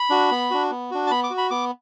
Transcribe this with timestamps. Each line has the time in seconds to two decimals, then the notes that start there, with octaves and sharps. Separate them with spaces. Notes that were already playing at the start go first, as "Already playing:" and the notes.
Already playing: B5
0.10 D4 F#4
0.31 B3
0.51 D4 F#4
0.71 B3
0.91 D4 F#4
1.07 A5
1.11 B3 B5
1.23 D6
1.30 F#4
1.38 B5
1.51 B3 D6